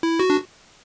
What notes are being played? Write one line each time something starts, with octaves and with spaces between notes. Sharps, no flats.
E4
F#4
D4